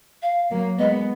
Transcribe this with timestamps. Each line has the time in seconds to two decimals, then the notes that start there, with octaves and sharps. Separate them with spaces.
0.23 F5
0.50 F#3 A#3
0.79 G#3 B3 D#5